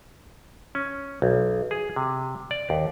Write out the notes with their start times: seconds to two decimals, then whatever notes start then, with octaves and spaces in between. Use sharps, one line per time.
0.75 C#4
1.22 B1
1.71 G#4
1.96 C3
2.51 D5
2.70 D#2